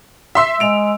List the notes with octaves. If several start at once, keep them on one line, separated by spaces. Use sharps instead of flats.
E5 C6 E6
G#3 D7 F7